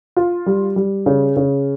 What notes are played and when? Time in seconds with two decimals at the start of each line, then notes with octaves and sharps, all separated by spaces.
0.16 F4
0.46 G3
0.76 G3
1.06 C#3
1.36 C#3